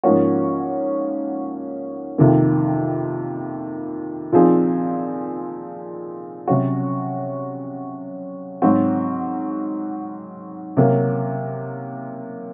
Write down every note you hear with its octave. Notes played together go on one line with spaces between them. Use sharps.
G#2 F3 A#3 C#4 F#4
F2 C3 D#3 A#3
A#2 F3 C4 D#4 G#4
C3 F#3 C#4 F#4
G#2 F#3 C4 F#4
C3 F#3 A#3